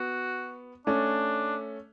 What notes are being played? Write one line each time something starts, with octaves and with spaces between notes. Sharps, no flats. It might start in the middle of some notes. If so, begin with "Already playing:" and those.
Already playing: B3 F#4
A3 C#4 D4